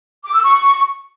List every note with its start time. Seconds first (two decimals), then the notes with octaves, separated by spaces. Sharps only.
0.25 D6
0.34 E6
0.44 C#6